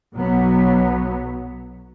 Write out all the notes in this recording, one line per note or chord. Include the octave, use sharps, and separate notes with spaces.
B1 B2 F#3 B3